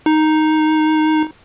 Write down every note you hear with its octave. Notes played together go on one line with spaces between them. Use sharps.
D#4